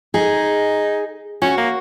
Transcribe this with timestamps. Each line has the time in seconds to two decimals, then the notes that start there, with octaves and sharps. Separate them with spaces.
0.14 D#4 G#4
1.42 C#4 F#4
1.57 A#3